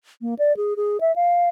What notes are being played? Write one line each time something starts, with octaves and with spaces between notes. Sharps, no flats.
A#3
D5
G#4
G#4
E5
F5